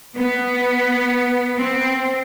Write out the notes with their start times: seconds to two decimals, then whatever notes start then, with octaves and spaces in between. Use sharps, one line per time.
0.16 B3
1.57 C4